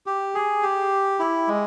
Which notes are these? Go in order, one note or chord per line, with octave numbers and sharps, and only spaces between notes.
G4
G#4
G4
E4
G#3